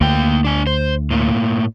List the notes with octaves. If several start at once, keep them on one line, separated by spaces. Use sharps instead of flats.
D2 A#3 G5
D4 G#5
C5
A2 A#3